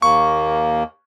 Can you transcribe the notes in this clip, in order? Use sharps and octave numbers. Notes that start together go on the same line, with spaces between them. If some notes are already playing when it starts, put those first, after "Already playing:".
D#2 A#3 C#6